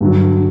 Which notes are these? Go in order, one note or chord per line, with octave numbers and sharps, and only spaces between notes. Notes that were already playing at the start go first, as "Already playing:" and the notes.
G2 D3 F#3